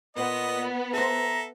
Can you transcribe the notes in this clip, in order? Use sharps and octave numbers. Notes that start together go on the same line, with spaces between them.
A#2 B3 D#5
A4 B4 C5 E5 A#5